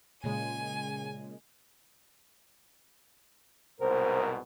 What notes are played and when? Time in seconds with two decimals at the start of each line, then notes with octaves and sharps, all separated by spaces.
0.24 A#2 C#3 G#3 G#5
3.80 C2 G#2 B2 A#4 C5